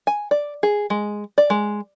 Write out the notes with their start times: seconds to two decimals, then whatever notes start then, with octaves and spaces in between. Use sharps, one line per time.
0.07 G#5
0.31 D5
0.63 G#4
0.90 G#3
1.38 D5
1.50 G#3